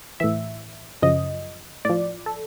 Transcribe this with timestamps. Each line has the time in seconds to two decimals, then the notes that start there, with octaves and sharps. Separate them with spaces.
0.20 A2 E3 E5
1.02 F#2 C#3 F3 D#5
1.85 A2 F3 D5
2.26 A4